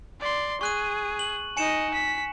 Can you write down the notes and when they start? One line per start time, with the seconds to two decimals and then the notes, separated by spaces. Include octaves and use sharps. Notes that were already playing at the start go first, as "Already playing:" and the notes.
0.20 D5 C6
0.61 G#4 C#6 F#6 D#7
1.19 F#7
1.57 D#4 D#5 G#5 C#7 E7
1.94 B6